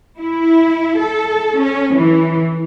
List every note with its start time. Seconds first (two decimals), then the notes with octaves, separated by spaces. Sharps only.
0.19 E4
1.01 A4
1.60 C#4
1.96 E3